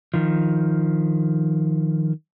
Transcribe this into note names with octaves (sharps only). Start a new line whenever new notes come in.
D#3 F3